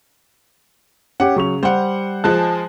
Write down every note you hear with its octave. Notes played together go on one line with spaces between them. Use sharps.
C#4 G4 F#5
C#3 F#3 C#6 F7
G3 C5 F#5
F3 G#3 A5 F#6